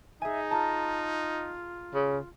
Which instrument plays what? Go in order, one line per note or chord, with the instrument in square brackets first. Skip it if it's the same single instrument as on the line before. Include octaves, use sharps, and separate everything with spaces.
[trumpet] D#4 [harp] G#4 G#5 [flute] E5
[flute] F4 [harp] A5 A#5
[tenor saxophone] C#3